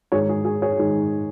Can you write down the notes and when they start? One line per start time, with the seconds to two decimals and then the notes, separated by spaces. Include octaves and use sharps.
0.12 G#2 D#3 G#3 G#4 C#5
0.29 G#4
0.45 G#4
0.62 G#4 C#5
0.78 G#2 D#3 G#3